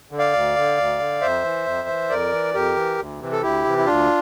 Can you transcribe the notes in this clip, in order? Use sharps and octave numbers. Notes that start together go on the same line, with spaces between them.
D3
D5 F5
D2
D3
D2
D3
F2 C5 E5
E3
F2
E3
F2 A#4 D5
E3
F2 G4 A#4
E3
D2
C3 E3
A4
D2 E4 G4
C3 E3
E4
D2 D4 F4